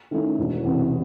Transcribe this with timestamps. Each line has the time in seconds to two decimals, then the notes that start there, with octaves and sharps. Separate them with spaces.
0.11 D#3 A3 C#4 E4
0.38 E1
0.64 E2 C3